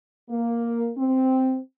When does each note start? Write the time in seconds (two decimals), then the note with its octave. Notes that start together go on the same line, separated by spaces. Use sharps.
0.30 A#3
0.97 C4